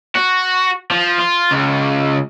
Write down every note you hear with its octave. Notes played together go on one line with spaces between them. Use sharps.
F#4
F3
F4
C#2